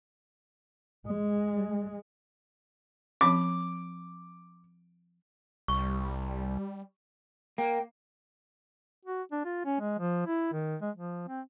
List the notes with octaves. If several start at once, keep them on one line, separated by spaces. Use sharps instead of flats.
G#3
F3 C4 B5 D6
C2 G3 C#6
A#3 G5
F#4
D4
F4
C#4
G#3
F3
E4
D#3
G#3
F3
C4